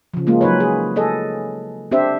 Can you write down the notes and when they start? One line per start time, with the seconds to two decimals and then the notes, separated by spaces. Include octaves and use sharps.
0.14 C#3 F3
0.27 G#3 A#3 F4
0.41 F#3 D#4 B4 C#5
0.60 G#4
0.96 G#4 A4 D#5
1.91 C4 D4 G4 C5 E5